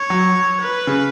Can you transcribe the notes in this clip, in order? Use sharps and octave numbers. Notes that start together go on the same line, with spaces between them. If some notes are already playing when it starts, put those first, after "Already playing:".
Already playing: C#5
F#3
B4
C#3